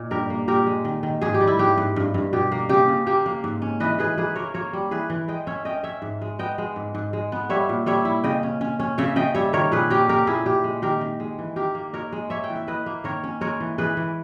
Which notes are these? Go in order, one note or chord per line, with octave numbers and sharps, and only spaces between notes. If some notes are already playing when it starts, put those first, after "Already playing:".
Already playing: A#2 D#4
G2 G4 A#4
A#3
A#2 G4 A#4
G#3
D#3
D#3
G#2 G#4
G4
G3
E4
G#2 G4
G#2
G2
G2
B2 G4
A#3
C#3 G4
C#3
A#3 G4
A#3
G#2
C#4
E3 B4 D#5
E3 G#4 B4
A#3 G#4 B4
A#3 A#4 C#5
A#3 A#4 C#5
G3
E3 G#4 B4
E3
G#3 D#5 G5
C#4 C#5 E5
C#4 D#5 G5
C#4 C#5 E5
G#2
G#3
B3 D#5 G5
G#3
G#2
G#2
G#3
B3
G3 C#5 E5
A#2
G3 C#5 E5
E4
C#3 D#5 G5
C#4
C#4
C#4
C#3 C#5 E5
C#3 D#5 G5
G3 C#5 E5
D#3 A#4 C#5
A#2 G#4 B4
C#4 G4 A#4
C#4 G4 A#4
A#2 E4 G#4
A#2 G4
G#3
D#3 G4 A#4
D#3
G#3
E3
D#3 G4 A#4
A#3
D#4 A#4 C#5
G#3
A#3 C#5 E5
G5
E3
E5
E4 B4 D#5
A#3
D#3 A#4 C#5
C#4
G#3 A#4 C#5
E3
E3 G#4 B4
E3